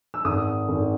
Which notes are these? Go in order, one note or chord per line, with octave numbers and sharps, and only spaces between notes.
E6
G#1 D#6
G#1